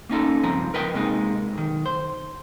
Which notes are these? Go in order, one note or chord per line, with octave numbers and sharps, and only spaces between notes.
A#3 C#4 D#4 A4
C#2 G2 F3 C4 A#5
A#4 B4 D#5 G5
C3 G#3 A#3 D4 D#4
B1 D#3
C5